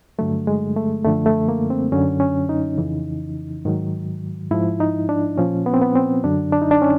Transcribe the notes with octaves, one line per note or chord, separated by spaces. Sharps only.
G2 D3 F#3 A3
G#3
A3
F#2 D3 F3 A3
A3
A#3
C4
F#2 D3 F#3 C#4
C#4
D#4
F2 C#3 E3
G#2 D#3 F#3
G#2 F3 E4
D#4
D4
A#2 F3 C#4
B3
C4
B3
C4
F#2 D3 F#3 D4
D4
D#4
D4
C#4